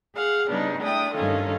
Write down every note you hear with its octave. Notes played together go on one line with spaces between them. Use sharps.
G#4 F5 F#5
C#3 G3 B3 D4 D#4
A3 D4 E4 G5 D#6
G2 D#3 C#4 D#4 F4 A4